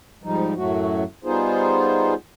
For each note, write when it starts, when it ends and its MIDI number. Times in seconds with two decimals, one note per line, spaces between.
0.24 0.54 44
0.24 0.54 53
0.24 0.54 55
0.24 0.54 63
0.56 1.04 42
0.56 1.04 45
0.56 1.04 54
0.56 1.04 57
0.56 1.04 66
1.24 2.14 55
1.24 2.14 59
1.24 2.14 63
1.24 2.14 65
1.24 2.14 68
1.24 2.14 72